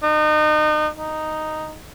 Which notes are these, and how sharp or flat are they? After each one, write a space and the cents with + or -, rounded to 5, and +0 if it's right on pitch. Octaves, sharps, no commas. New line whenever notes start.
D#4 -35
D#4 -5